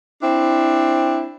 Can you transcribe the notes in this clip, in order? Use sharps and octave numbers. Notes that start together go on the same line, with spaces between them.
C4 D4 E4